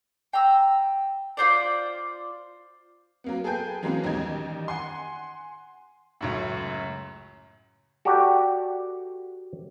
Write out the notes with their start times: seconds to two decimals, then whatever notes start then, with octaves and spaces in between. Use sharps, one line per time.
0.33 G5 A#5 E6
1.37 F4 F#4 C5 D5
3.24 F#3 A#3 B3
3.44 G#4 A4 B4 G5 G#5 G6
3.83 E3 F#3 G#3 A#3 B3 C#4
4.04 A1 D#2 G3 D#4 G#6
4.68 F#5 G#5 C6
6.21 C#2 F#2 A2
8.05 F#4 G4 A4 D5 F#5 G5